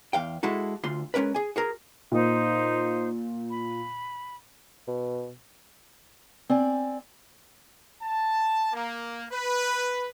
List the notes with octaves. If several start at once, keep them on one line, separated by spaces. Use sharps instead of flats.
E2 F5 G5
G#3 E4 F#4 A4
D2 F4 C6
G#3 A#3 C#4 A#4 B4
G#4 G#5
F#4 G#4 A#4
A#2 D#4 C5
B5
B2
C4 D5 G#5
A5
A#3
B4